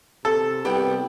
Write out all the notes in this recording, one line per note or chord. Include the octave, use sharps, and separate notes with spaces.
C3 A4
C2 B3 G4 G5